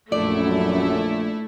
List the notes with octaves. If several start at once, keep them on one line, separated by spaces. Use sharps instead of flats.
A#1 F#2 A3 E4 D5